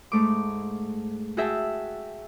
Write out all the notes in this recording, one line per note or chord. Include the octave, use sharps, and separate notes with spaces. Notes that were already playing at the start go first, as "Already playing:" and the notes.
G#2 A3 D6
F#4 G#4 E5 G5 A5